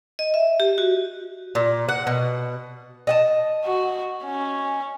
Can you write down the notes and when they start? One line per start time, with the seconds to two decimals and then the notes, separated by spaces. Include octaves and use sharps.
0.19 D#5
0.34 E5
0.60 G4
0.78 F#4
1.55 A#2
1.89 F#5
2.07 B2
3.07 D#5 F#5 A5
3.65 F#4
4.24 C#4